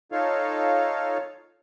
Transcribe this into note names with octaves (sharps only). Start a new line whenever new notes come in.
D#4 F4 A4 C#5 F5